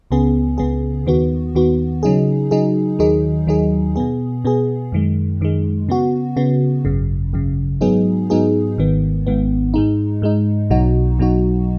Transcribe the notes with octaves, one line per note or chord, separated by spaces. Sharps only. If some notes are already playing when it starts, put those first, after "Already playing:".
C#2 C#3 B3 G#4
C#2 C#3 B3 G#4
D#2 D#3 B3 F#4
D#2 D#3 B3 F#4
C#3 F#3 D#4 G#4
C#3 F#3 D#4 G#4
D#2 D#3 F#3 D#4 G#4
D#2 D#3 F#3 D#4 G#4
B2 B3 G#4
B2 B3 G#4
F#2 D#3 G#3
F#2 D#3 G#3
C#3 B3 F#4
C#3 B3 F#4
G#1 F#2 C#3
G#1 F#2 C#3
G#2 F#3 B3 D#4 G#4
G#2 F#3 B3 D#4 G#4
G#1 G#2 D#3 B3
G#1 G#2 D#3 B3
G#2 G#3 D#4
G#2 G#3 D#4
B1 B2 F#3 D#4 F#4
B1 B2 F#3 D#4 F#4